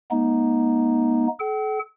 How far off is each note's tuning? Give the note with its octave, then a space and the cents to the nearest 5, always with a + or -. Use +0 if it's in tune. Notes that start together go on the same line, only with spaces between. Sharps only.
G#3 +15 B3 -45 D#4 +0
A4 -40 G5 -45